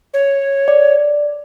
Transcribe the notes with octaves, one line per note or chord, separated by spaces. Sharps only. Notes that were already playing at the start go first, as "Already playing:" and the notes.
C#5
D5